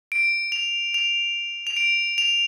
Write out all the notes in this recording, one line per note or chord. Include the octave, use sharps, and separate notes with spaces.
D7
F7
F7
F7
D7
F7